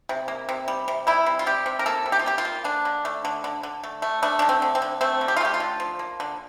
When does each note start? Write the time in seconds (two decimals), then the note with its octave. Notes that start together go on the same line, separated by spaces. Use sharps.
0.09 C3
0.28 A#3
0.49 C3
0.68 G3
0.88 C3
1.07 G3 E4
1.26 C3
1.39 F4
1.46 C3 G4
1.66 C3
1.79 A#4
1.86 A#3 A4
2.06 C3
2.12 G4
2.19 F4
2.26 A#3 G4
2.38 F4
2.45 A#3
2.64 D3 D4
2.85 D3
3.05 A3
3.25 D3
3.44 D3
3.63 D3
3.84 A3
4.02 A3
4.22 A3 D4
4.39 D3 D4
4.49 C4
4.62 D3
4.75 C4
4.82 D3
5.01 A3 C4
5.21 D3
5.28 G4
5.37 F4
5.41 A3 G4
5.54 F4
5.60 D3
5.80 F3
5.99 A#3
6.20 D3